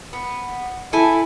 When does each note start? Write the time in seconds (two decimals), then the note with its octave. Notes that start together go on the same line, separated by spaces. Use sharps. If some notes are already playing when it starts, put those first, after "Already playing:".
0.13 B3
0.93 E4 A4 G#5